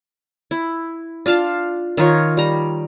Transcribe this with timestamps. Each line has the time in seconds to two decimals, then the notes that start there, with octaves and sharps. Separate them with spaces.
0.51 E4
1.26 D4 F4 F5 A5
1.97 D#3 D#4 F4 C#5
2.37 G3 A#5